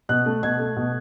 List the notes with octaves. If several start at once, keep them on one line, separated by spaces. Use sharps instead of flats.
B2 F#6
A3
B2 G#6
A3
B2